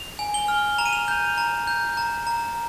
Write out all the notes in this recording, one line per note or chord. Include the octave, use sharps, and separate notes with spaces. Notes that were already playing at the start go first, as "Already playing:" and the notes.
Already playing: F7
G#5
G7
F6
A#5 F7
D#7
F7
G6
A#5
G6
A#5
A#5